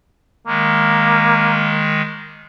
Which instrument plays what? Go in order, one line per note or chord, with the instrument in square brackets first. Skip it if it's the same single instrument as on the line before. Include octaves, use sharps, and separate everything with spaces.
[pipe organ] D#3 G#3 [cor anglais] A#3